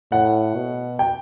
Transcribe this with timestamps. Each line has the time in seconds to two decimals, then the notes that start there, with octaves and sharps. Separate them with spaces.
0.12 A2 F#5
0.56 B2
0.99 G5